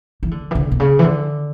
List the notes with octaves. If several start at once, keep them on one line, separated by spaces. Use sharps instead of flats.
E3
D3
E3
D3
B2
C#3
E3
D3